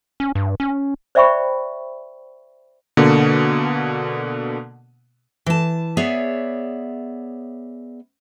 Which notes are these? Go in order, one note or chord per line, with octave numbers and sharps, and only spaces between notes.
C#4
G2
C#4
C5 D5 E5 G5 B5 C#6
B2 D3 A#3
E3 A5
B3 G#4 C#5 D5 E5